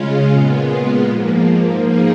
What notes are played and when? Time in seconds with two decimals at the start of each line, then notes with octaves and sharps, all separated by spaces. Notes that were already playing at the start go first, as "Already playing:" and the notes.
Already playing: C#3 G#3 C#4 F4
0.29 A#2 G#3 B3 F4
1.04 G#2 F3 A#3
1.77 F3 A#3 D#4 G#4